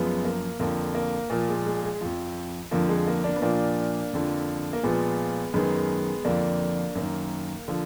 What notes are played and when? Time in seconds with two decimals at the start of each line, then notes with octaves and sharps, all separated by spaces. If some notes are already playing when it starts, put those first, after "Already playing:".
Already playing: F#2 F3 G#3 B3
0.25 A#3
0.59 F2 D3 F3 A#3
0.95 A#3
1.30 A#2 F3 A#3
1.49 G#3
1.66 G#3
1.83 G#3
2.01 F2 F3
2.71 F2 D3 F3 A#3
2.89 G#3
3.07 A#3
3.24 A#3 D4
3.36 B3
3.42 A#2 F3 A#3 D4
4.13 F2 D3 F3
4.73 A#3
4.83 A#2 F3 G#3 B3
5.54 F#2 D#3 G#3 B3
6.25 F2 D3 F3 A#3 D4
6.95 F#2 A#3
7.01 D#3
7.68 D3 F3